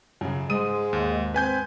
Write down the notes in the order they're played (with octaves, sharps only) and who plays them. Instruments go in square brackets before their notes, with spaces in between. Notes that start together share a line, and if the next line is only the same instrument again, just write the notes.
[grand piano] F#2 C#3
[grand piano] G#2 D#6 D#7 [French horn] G#3
[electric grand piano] D#2
[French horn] C4 [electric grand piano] B4 G#5 G6